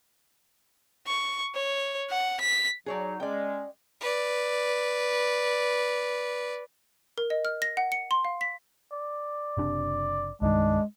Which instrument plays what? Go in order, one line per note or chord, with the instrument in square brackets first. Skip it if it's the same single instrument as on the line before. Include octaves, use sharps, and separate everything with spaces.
[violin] C#6
C#5
F#5
B6
[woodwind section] F#3 D#4 [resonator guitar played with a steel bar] G#4 C#5 D5
[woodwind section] G#3 C#4 [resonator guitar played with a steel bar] D5 G5
[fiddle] B4 D5
[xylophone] A#4
D#5
F6
A#6
F#5
C#7
C6
F5
B6
[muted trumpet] D5
[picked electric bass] F#1 C3 D4
[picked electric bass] C2 G2 D#3 [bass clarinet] G#3 [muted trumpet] D4